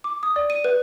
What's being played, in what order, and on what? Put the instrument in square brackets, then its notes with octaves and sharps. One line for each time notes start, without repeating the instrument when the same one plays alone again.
[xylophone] D6
D#6
D5
D#7
B4